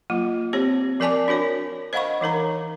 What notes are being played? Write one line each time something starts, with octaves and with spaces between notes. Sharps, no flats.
F#3 A#3 F4
C4 G4 C5 C#5
F3 A#4 D5 G#5 A5 D6
D4 F#4 A#4 C#5
C5 D#5 F5 F#5 B5 C#6
E3 D#4 A#4 A#5